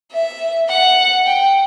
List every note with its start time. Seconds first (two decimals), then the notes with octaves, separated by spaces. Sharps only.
0.12 E5
0.69 F#5
1.26 G5